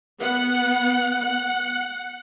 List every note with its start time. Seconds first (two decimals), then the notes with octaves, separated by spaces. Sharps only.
0.20 B3 F#5
1.20 F#5